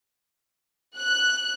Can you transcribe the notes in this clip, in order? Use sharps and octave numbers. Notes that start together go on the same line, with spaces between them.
F#6